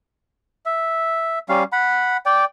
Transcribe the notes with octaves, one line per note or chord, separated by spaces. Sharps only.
E5
G3 C#4 F5
F#5 B5
D5 G5